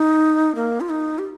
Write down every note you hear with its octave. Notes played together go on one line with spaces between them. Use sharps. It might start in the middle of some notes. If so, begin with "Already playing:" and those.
Already playing: D#4
A#3
F4
D#4
G4